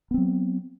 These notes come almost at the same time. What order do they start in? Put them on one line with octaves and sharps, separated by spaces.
B3 C4 F#3